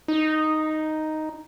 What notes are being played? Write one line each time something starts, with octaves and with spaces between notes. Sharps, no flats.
D#4